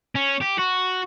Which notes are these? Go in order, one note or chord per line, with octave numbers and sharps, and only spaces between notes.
C#4
G4
F#4